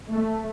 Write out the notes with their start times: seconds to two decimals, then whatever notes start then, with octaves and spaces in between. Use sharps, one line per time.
0.12 A3